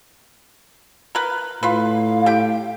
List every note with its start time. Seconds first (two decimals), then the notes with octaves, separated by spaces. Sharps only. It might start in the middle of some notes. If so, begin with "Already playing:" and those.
1.15 A#4 B4
1.63 A2 F4 B4 F5
2.26 G4 G5